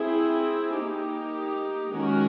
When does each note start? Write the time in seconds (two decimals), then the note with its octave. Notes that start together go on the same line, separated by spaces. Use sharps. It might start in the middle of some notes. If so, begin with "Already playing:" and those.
Already playing: C4 E4 G#4
0.77 A#3 D#4 G4
1.96 D#3 G#3 C#4 F#4 A#4